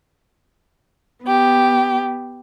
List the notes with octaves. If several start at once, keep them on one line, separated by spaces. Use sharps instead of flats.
B3 G4